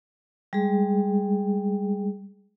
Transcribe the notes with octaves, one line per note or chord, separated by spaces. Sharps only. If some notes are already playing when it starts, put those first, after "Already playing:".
G3 G#3 G#4